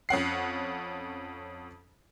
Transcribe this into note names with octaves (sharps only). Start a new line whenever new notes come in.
F2 C#4 F#5 C7